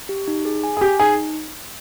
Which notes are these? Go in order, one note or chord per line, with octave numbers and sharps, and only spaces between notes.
G4
D#4
G#4
G#5
G#4
G4 G#5
D#4 G#4